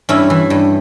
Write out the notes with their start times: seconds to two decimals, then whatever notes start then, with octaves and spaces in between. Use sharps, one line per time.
0.09 G2 C#4 E4
0.30 E3
0.50 G2